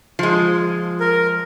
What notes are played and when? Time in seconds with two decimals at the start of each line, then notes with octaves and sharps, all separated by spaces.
0.19 F3 G#3
1.00 A#4